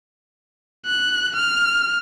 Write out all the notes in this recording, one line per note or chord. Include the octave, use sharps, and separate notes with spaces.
F#6
F6